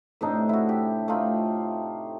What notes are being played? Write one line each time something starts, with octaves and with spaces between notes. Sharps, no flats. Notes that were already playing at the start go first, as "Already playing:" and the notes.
A2 C3 D4 D#4
E4 F#4
G4
A3 D#4 F4